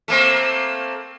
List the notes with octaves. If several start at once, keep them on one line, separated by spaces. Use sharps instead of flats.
A3 A#3 C4